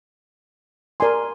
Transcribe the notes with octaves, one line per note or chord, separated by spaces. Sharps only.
A#4 D5 G#5 C6